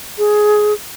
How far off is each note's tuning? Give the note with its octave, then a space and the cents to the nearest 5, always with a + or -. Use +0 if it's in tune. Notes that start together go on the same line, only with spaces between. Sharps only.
G#4 +15